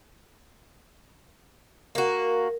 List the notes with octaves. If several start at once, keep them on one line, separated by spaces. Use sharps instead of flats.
A#3 F#4 A#4